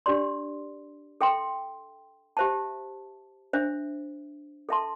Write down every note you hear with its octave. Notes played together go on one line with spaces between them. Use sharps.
D4 G4 D5 C6
A4 E5 G5 C6
G4 C5 E5 A5
D4 C5 E5
A4 E5 A5 C6